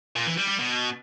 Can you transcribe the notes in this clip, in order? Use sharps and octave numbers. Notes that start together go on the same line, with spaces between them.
A#2
E3
G3
G3
B2